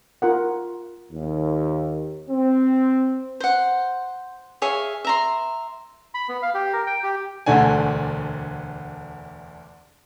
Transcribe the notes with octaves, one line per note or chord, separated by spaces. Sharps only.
F4 A#4 F#5
D#2
C4
C5 F#5
G#4 C#5 E5 F5
E5 A#5 C6
B5
B3
F5
G4
A#4
G5
G4
E1 D2 D3 A3 D4 G#5